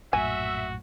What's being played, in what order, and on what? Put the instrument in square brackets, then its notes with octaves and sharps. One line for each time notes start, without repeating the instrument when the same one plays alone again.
[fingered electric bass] A#1 F#2 A2 [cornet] F#4 [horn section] E5 [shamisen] G#5